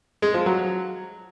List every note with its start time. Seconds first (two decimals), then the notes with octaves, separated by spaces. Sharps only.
0.22 G#3
0.34 F3
0.46 F#3